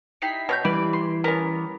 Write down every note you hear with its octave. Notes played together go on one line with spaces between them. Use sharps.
D#4 E4 G4 B6 C7
B2 C#5 F6 G6
E3 G3 B4 D5
C6
B3 C#4 A#4